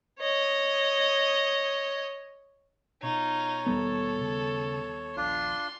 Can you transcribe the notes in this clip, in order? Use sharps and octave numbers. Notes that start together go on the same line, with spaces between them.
C#5 D#5
B2 D#4 F4 C#5
D#2 G3 B3 A4
C#3
A#1 D4 F4 C6